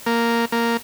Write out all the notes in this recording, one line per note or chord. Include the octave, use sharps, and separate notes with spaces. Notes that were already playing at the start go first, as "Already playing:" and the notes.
A#3
A#3